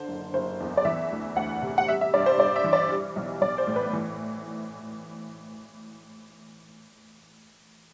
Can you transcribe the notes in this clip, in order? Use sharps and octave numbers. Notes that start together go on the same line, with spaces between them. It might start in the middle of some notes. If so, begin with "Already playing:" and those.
Already playing: D3 C5
F#1
F#1 C5
E2
D5
E3 E5
D2
D2 F#5
C3
F#5
G3 E5
E5
G2 D5
C5
G2 D5
E5
E3
D5
G3
B1
B1 D5
C5
A2
B4
E3